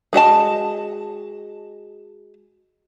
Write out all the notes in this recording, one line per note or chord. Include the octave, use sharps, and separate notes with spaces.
G#3 F#4 D#5 A5